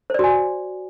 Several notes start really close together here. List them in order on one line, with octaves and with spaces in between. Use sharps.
C5 D5 F#4 G#5